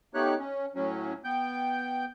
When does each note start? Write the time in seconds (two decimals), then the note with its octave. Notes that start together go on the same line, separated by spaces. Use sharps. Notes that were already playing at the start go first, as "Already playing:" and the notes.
0.14 A3 B3 D#4 G4 C#5 F#6
0.39 C#4
0.75 A2 F#3 C#4
1.24 B3 G5 G6